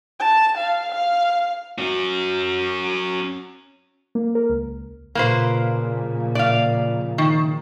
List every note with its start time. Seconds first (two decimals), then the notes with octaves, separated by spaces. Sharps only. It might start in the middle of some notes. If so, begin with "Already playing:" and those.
0.20 A5
0.57 F5
0.92 F5
1.78 C#4 F#4
4.15 A#3
4.35 A#4
4.49 C#2
5.15 A#2 C#3 F3 A#3 B4 C5
6.35 D5 F5
7.18 D#3